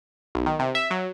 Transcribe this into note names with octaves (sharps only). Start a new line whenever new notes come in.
B1
D#3
C3
E5
F#3